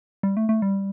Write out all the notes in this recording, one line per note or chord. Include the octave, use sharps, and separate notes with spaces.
G3
A3
A3
G3